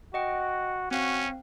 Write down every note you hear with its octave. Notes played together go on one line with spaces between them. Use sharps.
F#4 D#5 F#5 G5
C4 C#4 F#4 F5